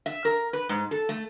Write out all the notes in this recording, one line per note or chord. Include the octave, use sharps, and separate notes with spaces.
E5
A#4
B4
G#2
A4
A3